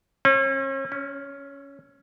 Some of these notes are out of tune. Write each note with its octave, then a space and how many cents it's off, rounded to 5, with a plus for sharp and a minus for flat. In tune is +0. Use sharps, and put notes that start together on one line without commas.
C#4 -40
C#4 +10